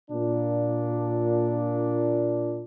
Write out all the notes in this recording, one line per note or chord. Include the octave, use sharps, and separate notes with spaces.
A#2 D4